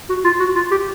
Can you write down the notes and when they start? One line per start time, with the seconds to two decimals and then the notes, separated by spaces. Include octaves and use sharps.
0.09 F#4
0.24 F4
0.40 F#4
0.56 F4
0.71 G4